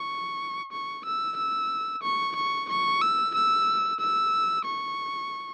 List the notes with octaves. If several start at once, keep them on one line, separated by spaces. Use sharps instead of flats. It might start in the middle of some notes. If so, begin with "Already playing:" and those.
Already playing: C#6
C#6
E6
E6
C#6
C#6
C#6
E6
E6
E6
C#6